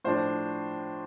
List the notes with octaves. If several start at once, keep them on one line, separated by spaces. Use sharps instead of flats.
A2 F3 D4 C5